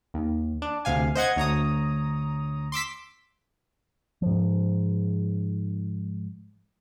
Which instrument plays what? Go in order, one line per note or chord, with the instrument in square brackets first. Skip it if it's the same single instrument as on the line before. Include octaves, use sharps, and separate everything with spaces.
[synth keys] D#2
D4
D2 C3 F5 G#5
C5 D#5 F#5 G#6
D2 C#5 A#5 D#6
C6 D6 E6 B6
[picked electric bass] G#2 F3